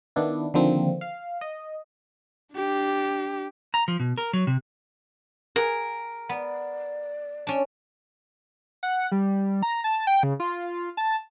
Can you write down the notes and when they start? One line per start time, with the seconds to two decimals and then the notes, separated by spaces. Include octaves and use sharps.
0.16 D#3 B3 D4 E4
0.54 D3 D#3 F3 A#3 C4
1.01 F5
1.41 D#5
2.53 D4 G4
3.74 A#5
3.88 F3
4.00 B2
4.18 A#4
4.33 F#3
4.47 C3
5.56 G#4 A#4 F#5
6.29 B3 D5
7.47 C#4 D4
8.83 F#5
9.12 G3
9.63 A#5
9.84 A5
10.07 G5
10.23 C#3
10.40 F4
10.97 A5